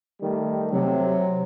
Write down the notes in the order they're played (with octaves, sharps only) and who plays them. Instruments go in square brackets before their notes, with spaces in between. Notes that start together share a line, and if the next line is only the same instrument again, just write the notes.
[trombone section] D#3 G3 A3
[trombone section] C3 [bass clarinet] F#3